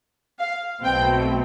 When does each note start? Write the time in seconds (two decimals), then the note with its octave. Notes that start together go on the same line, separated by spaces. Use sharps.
0.39 F5
0.83 B1 B2 A3 C4 G5